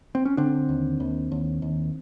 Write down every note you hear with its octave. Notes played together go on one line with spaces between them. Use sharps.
C4
C#4
D3 C4 D4
D#2
D#2
D#2
D#2